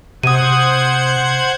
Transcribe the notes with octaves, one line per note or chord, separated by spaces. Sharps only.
C3 C5 F#5 D#6 G#6 D#7